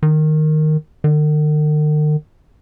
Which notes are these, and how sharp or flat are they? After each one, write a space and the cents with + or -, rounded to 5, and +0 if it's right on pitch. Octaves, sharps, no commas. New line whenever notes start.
D#3 -10
D#3 -45